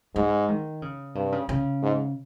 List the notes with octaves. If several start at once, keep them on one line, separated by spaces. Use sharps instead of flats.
G#2 G#3
D#3
C#3
G2 C3
C#3
C#3
G#2